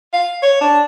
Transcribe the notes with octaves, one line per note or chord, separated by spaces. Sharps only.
F5
C#5
D4